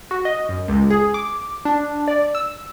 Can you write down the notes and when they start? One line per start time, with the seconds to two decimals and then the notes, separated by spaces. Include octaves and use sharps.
0.11 F#4
0.25 D#5
0.49 F#2
0.68 C#2
0.90 G#4
1.14 D6
1.65 D4
2.08 D5
2.35 E6